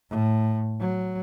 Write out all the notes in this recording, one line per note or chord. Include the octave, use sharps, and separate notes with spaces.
A2
F#3